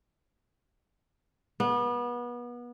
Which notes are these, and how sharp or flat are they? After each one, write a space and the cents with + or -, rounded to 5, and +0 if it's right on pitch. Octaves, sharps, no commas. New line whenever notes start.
B3 -30